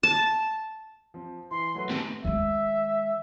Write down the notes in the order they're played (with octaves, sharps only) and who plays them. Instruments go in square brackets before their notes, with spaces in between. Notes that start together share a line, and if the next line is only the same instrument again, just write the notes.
[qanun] A5
[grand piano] F3 C4
[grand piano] E3 [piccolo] C6
[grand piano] F#3 A3 B4
[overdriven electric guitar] A2 C3 [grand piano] D#3
[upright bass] D#3 G#3 [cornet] E5